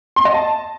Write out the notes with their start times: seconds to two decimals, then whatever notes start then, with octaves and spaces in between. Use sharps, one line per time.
0.16 C6
0.25 D#5
0.34 A5